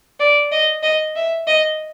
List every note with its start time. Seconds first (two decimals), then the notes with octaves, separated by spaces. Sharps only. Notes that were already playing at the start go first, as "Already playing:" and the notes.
0.20 D5
0.52 D#5
0.83 D#5
1.16 E5
1.47 D#5